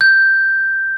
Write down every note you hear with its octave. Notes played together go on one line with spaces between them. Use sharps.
G6